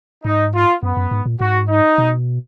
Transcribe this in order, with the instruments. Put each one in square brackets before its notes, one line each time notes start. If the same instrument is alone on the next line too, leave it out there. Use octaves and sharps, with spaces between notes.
[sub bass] G#2 [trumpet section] D#4
[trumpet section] F4
[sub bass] F#2 [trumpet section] B3
[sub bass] F#2
G#2
A#2
[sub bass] G#2 [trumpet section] F#4
[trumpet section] D#4
[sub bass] B2